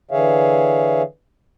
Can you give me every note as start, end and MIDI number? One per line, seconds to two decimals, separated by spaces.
0.11 1.02 50
0.11 1.02 52
0.11 1.02 68
0.11 1.02 73
0.11 1.02 76
0.11 1.02 77